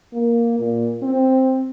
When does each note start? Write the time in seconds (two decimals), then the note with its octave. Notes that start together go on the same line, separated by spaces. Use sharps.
0.13 A#3
0.59 A#2
1.02 C4